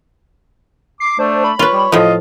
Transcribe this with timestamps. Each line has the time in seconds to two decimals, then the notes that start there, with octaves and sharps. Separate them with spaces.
1.00 D6 C7
1.19 A3 D4 C5
1.44 B5
1.59 F4 B4 C#5
1.73 G3
1.92 A2 F3 F4 D#5